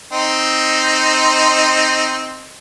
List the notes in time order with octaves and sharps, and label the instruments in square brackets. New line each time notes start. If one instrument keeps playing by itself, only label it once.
[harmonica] C4 D#4